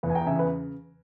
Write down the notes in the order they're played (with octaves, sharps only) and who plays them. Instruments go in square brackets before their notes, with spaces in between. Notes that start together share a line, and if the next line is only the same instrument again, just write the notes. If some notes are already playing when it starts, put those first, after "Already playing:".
[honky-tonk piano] E2 [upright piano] B4
[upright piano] G#5
G5 A#5
[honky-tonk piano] C#3 [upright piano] E5 G#5
[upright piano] B4